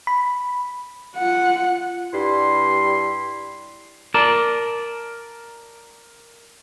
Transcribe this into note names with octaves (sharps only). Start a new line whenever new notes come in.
B5
F4 F#5
G2 G3 E4 C6
A#4 D5 A5